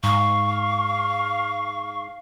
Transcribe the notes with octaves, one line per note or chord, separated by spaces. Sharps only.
G#2 F5 C#6